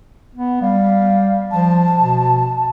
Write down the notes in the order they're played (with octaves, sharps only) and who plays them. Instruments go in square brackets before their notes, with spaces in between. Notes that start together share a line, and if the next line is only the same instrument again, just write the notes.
[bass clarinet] B3
[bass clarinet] G3 [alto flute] F5
[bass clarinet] F3 [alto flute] A5
[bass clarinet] B2